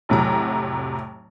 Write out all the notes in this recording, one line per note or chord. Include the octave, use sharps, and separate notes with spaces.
F1 A2 C3 F#3 A#5